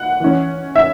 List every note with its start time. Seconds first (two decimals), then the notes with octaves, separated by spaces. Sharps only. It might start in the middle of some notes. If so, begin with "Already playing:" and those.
Already playing: F#5
0.20 E3 C#4
0.76 E5